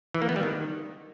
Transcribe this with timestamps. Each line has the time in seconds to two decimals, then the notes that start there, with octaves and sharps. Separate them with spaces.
0.14 E3
0.22 A#3
0.29 B3
0.36 G3
0.43 D#3